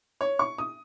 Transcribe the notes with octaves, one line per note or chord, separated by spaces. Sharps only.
C#5
C#6
D#6